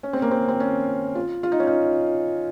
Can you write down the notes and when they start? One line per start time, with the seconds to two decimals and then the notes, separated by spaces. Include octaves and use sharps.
0.03 C#4
0.13 C4
0.22 A#3
0.31 C4
0.48 C4
0.60 C#4
1.15 F4
1.43 F4
1.52 D#4
1.60 C#4
1.67 D#4